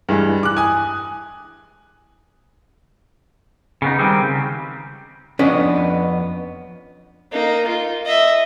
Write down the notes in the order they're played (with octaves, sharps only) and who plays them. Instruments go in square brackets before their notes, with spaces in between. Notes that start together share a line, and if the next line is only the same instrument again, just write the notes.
[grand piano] G2 E3 G#3
D6 F#6
G#5 D#6
[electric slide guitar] C#3 B3 D#4
D#3 G3 G#3 C4
C#3
[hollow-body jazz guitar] F2 B3 C#4 D4 B4 D#5
[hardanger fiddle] A#3 D#4
F4
D#5 E5